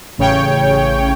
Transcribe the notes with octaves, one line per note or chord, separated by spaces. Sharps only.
A1 C#3 C#5 G5